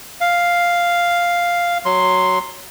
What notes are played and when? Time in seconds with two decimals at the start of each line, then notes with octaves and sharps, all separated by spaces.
0.21 F5
1.85 F#3 C6